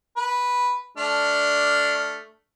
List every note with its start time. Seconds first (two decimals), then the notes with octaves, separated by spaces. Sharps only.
0.17 B4
0.98 A3 D4 F6